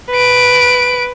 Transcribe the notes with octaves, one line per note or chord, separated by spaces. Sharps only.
B4 D7